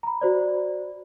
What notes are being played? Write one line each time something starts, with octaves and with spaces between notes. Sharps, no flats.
A#5 B5
F#4 C5 D5